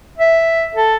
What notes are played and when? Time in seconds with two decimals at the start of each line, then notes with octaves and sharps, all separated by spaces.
0.18 E5
0.75 A4